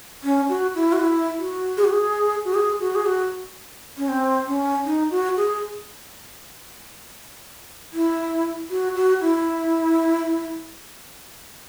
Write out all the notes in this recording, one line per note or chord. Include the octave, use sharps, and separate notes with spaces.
C#4
F#4
E4
F#4
E4
F#4
G#4
F#4
G#4
F#4
G#4
F#4
G#4
F#4
C#4
C4
C#4
D#4
F#4
G#4
E4
F#4
F#4
E4